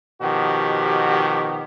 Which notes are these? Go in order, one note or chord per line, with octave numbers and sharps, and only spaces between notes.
B2 D#3 F3 F#4 G4